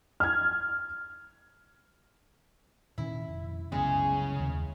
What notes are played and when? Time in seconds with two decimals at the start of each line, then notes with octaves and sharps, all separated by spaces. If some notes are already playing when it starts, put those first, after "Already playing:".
0.20 F6 G#6
2.98 A#2 D#3 C#4 E4
3.28 F1
3.72 C2 F#2 C#3 G#3 B3
4.40 D#2